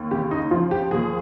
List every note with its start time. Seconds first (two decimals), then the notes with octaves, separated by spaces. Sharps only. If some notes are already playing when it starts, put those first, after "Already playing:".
Already playing: D#2
0.11 C#3 G4
0.31 D#4
0.51 F3 F4
0.71 G4
0.91 D#2 G#4